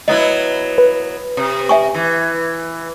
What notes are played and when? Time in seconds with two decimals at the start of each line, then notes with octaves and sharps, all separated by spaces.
0.08 F#3 B3 E4 D#5
0.78 B4
1.37 C3
1.69 E5 G#5 C#6
1.94 E3